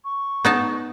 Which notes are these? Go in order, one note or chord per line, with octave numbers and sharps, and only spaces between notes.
C#6
B3 D#4 A5